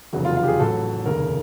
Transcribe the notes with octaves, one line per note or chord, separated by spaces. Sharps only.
F1 E2 C#3 F#3
F4
F4
G4
G#4
A1 A2 F#3 A4
F1 D#2 C#3 A#4